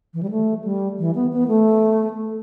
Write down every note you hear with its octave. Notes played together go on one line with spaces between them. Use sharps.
E3
G3
A3
G3
E3
B3
B3
A3